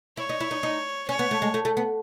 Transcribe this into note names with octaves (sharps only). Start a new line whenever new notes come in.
E4 C#5
D#4
E4
D#4
D#4
C#4 C#5
B3
A3
G#3
A3
A3
B3